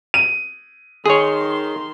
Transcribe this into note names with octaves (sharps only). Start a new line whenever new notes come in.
D#7
D#3 G#4 C#5 C6